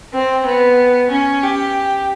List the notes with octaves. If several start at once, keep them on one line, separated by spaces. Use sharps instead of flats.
C4
B3
C#4
G4